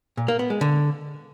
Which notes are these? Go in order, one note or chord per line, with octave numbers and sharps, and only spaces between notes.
A#2
A#3
B3
G#3
D3